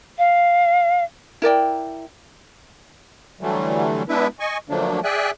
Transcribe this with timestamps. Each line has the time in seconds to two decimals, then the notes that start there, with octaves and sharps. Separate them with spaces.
0.18 F5
1.42 E4 A#4 D5 G5
3.41 D3 E3 F#3 G3 A3
4.09 G#3 B3 D4 E4 B4 E5
4.40 D#5 G#5 C#6
4.69 D3 F3 F#3 A3 A#3 D4
5.04 G#4 D5 E5 G5 G#5 F#6